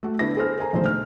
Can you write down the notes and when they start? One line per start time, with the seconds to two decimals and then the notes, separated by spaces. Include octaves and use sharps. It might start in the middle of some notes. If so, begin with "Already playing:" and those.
0.03 A3 F#4
0.19 D3 B3 D4 E4 A#6
0.37 G#4 A4 C5 F6
0.57 A#4 C5 G#5 A#5
0.73 A#1 B2 D3 D#3 A3 C5
0.86 F6